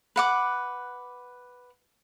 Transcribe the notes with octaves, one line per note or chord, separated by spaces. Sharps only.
B4 F#5 D6